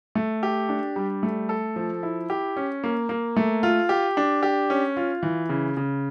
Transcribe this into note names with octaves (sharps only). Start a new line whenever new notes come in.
A3
G4
D4
G3
A3
A4
F3
E4
G4
C#4
A#3
A#3
A3
F4
G4
D4
G4
C#4
F4
E3
C#3
C#3